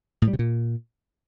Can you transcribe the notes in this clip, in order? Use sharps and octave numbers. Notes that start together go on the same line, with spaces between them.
A2
G3
C3
A#2